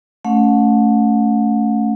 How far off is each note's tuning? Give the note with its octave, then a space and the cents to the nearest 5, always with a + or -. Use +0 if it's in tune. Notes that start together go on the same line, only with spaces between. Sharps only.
A3 -5 C#4 +10 F#5 -40